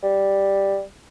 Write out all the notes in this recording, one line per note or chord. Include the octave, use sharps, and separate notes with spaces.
G3